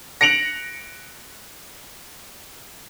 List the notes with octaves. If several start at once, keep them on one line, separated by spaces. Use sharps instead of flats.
A#6 C#7 D7 F7 F#7